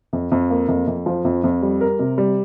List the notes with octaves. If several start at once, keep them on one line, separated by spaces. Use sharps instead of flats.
F2
F2
A#3
F2
F2
F3
F2
F2
G3
A#4
C3
G3